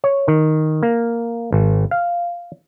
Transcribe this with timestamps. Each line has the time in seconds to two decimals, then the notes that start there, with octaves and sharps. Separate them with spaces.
0.04 C#5
0.28 D#3
0.83 A#3
1.52 G#1
1.91 F5